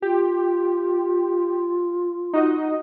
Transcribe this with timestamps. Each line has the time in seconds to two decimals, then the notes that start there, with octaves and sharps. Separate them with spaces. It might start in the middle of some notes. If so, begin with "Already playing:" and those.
0.02 F4 G4
2.33 D#4 F#4 D#5